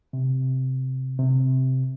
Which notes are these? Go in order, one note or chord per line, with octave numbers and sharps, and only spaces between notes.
C3
C3